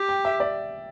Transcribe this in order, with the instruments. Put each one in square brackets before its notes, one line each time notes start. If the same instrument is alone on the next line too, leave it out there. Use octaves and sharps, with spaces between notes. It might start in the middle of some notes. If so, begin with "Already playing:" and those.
Already playing: [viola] G4
[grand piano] G5
E5
D5